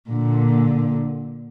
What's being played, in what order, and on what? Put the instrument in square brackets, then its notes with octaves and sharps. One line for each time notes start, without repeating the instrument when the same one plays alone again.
[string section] A#2 D3